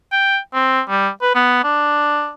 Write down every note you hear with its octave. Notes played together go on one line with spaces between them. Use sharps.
G5
C4
G3
B4
B3
D4